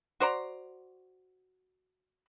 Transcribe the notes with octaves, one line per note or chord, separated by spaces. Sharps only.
F#4 C5 D5 A#5